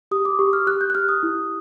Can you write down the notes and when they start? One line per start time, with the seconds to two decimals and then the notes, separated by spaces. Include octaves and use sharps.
0.11 G4 D#6
0.25 D6
0.39 G4 C#6
0.53 F6
0.67 G4 F#6
0.81 G6
0.90 F#6
0.95 G4 F6
1.09 D#6
1.23 E4